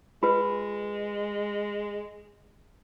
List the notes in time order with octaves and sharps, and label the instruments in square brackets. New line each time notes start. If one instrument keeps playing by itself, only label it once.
[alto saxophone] G#3 [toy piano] F4 B4